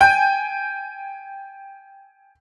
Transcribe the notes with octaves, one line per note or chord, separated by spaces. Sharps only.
G5 G#5 G6